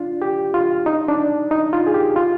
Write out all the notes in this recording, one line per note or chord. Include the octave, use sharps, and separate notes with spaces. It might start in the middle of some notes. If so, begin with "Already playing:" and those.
Already playing: D4 F4
G4
F4
D#4
D4
D#4
F4
G#4
G4
F4